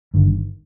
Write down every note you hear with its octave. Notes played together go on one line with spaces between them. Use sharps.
G1 G2 D#3